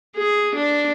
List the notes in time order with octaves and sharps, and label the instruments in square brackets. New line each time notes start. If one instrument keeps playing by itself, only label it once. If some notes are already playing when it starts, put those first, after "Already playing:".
[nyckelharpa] G#4
D4